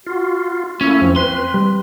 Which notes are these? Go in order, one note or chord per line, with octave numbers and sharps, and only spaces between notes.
F4 F#4
A3 A#3 C#4 E4
F2 F3 C4
B4 C6
G3